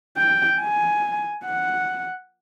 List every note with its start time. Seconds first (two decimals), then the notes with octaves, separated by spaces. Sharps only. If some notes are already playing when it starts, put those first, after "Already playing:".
0.17 G5
0.60 G#5
1.45 F#5